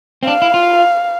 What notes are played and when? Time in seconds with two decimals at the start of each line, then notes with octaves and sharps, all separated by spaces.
0.23 C4
0.27 D4 F5
0.42 E4
0.54 F4